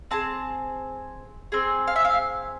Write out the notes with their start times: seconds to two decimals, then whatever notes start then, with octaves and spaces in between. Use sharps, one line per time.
0.11 C4 G#4 A5
1.52 C4 G#4
1.87 F5
1.96 E5
2.05 F5